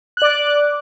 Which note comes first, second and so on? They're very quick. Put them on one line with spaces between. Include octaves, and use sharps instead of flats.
F#6 D5 D6